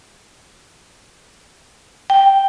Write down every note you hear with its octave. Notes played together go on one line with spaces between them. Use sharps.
G5